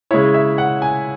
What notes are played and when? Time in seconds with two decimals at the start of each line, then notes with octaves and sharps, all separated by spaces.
0.11 C#3 G#3 C#4 E4 C#5
0.34 E5
0.58 F#5
0.82 G#5